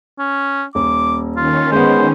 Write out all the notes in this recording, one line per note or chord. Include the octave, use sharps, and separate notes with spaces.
C#4
D#1 D6
D#3 C#4 F4
G#3 B3 C5